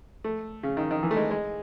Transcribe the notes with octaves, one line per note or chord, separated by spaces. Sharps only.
A3
C#3
D#3
D#3
E3
A3
G#3
G#3